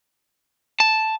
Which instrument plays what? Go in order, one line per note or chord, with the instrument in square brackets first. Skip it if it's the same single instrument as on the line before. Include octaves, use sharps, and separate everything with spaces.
[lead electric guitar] A5